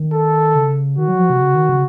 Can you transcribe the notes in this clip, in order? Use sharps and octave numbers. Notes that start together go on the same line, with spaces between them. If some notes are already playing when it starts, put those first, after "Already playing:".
Already playing: D#3
A4
C#3
D#3 F#4
F#3
F3
C3
C#3
D#3
C#3